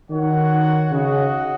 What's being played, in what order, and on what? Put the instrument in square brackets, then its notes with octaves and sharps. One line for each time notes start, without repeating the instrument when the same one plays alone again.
[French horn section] D#3 [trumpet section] F#4 C#5 F#5
[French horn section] C#3 [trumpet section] F#4 D#5 F#5